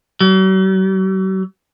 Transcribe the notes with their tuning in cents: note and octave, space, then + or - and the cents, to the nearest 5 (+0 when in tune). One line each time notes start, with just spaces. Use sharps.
F#3 +45